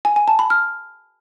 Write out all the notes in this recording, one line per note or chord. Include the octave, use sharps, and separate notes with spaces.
G#5
G#5
A5
B5
F6